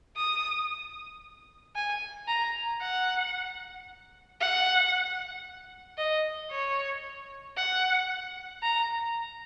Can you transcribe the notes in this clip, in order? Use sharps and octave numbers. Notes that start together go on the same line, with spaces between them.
D#6
G#5
A#5
F#5
F#5
D#5
C#5
F#5
A#5